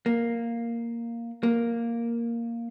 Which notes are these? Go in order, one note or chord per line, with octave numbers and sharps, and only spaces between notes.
A#3
A#3